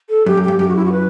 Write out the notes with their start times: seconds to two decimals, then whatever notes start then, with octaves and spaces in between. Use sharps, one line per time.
0.09 A4
0.26 F#2 G4
0.37 F#2
0.43 G4
0.48 G2
0.59 F#2 G4
0.67 F#4
0.75 E4
0.84 F#4
0.92 B4